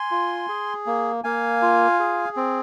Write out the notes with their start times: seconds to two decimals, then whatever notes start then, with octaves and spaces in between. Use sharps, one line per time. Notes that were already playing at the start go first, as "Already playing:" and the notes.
Already playing: G#5 C6
0.11 F4
0.49 G#4
0.86 A#3
1.24 A#3 F5 G#5
1.62 F4
2.00 G#4
2.36 C4